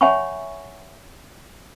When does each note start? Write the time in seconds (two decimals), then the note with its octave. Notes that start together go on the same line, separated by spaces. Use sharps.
0.01 C#5 E5 F#5 G#5 B5 C#6